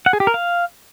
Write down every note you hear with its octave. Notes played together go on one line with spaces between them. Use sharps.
F#5
G#4
G4
A#4
F5